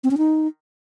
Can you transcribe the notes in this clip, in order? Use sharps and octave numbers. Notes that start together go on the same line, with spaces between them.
C4
C#4
D#4